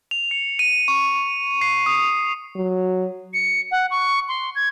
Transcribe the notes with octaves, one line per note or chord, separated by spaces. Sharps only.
F7
C#7
D#7
C#6
C7
D#6
F#3
C#7
F#5
C#6
C6
G#6